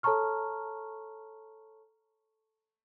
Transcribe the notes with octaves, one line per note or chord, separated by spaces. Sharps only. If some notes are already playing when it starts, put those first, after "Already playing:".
A4 C#5 A5 A#5 C#6 F6